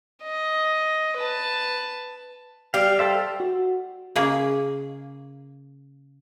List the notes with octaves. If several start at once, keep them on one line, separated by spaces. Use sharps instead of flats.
D#5
B4 A5
G3 G4 F5
A4 C5 E5
F#4
C#3 A#3 G#4